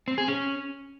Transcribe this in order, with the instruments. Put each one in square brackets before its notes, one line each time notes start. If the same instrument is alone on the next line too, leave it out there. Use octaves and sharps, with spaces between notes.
[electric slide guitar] C4
G#4
C#4